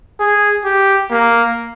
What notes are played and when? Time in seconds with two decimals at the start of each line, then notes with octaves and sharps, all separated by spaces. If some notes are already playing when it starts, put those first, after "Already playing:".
0.20 G#4
0.65 G4
1.11 A#3